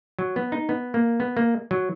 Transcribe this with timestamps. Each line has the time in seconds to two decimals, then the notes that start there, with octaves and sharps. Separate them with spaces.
0.19 F#3
0.36 B3
0.52 D#4
0.69 B3
0.94 A#3
1.20 B3
1.37 A#3
1.71 F#3